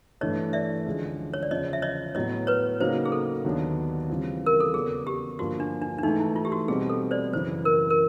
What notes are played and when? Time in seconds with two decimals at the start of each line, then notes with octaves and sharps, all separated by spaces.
0.21 G2 E3 A3 C#5 D#5
0.53 D5 E5
0.86 D2 D3 F3 G#3 C#4
1.34 C#5
1.43 D5
1.51 E2 C#3 F3 C#5 D#5
1.73 E5
1.82 C#5 D#5
2.15 A2 F#3 B3 C#5 D#5
2.47 B4 C#5
2.80 C#3 F#3 A#3 D#4 F#4 C5
3.05 G#4
3.12 A4
3.45 D#2 D3 F#3 B3 D4
4.09 C#3 E3 G3 C4 F4
4.46 A#4
4.60 A4
4.74 E2 C#3 F#3 B3 G#4
5.07 G4
5.39 G2 D3 F3 A#3 F#4
5.60 D4
5.82 D4
5.98 D4
6.03 G#2 E3 A3 D#4
6.20 E4
6.36 F4
6.45 G4
6.52 F#4
6.68 B2 G3 C4 G#4
6.90 A4
7.11 C5 D5
7.33 F#2 C#3 E3 C5
7.65 A#4
7.90 A#4